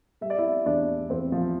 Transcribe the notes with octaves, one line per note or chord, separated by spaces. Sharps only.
G3 E5
D5
E4 E5
E2 D4 D5
E2 C4 C5
F3 F4